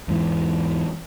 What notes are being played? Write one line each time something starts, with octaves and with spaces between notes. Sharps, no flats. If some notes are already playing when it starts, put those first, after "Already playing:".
E2 G#2 E3